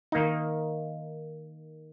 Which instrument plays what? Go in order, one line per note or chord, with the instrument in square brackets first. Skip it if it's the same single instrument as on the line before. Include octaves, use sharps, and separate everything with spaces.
[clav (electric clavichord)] D#3 A#3 D#4